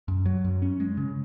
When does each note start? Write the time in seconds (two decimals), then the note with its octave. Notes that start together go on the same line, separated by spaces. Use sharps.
0.08 F#2
0.26 F#3
0.44 F#2
0.62 C#4
0.80 G#3
0.97 C#3